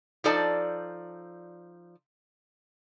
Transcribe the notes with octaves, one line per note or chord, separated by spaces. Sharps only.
F3 D#4 A4 D5 A5